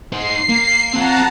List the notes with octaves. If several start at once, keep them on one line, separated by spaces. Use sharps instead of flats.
D#4 C5 C7
A#3
C4 F4 F#5 A5 A#5